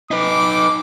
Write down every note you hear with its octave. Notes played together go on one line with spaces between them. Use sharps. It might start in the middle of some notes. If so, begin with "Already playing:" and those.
D#4 B4 D6